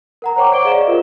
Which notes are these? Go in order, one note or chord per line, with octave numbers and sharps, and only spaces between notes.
A#4 F#5 A#5
C5 C#5 G5 C#6 D6
C5 D5 F#5 D7 G7
G#4 D#5 F5 E7
F4 G4 A#4